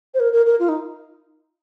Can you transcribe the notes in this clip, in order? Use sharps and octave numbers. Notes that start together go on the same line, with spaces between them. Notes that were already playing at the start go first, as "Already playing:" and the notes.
C5
A#4
A#4
A#4
F4
D#4